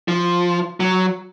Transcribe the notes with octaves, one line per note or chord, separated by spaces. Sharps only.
F3
F#3